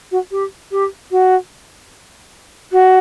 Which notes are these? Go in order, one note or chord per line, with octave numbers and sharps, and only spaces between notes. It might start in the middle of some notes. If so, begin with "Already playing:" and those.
F#4
G4
G4
F#4
F#4